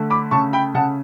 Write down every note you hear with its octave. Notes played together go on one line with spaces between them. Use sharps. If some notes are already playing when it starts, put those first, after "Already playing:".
Already playing: D3 A3
B5 D6
C#3 A5 C#6
G5 B5
C#3 F#5 A5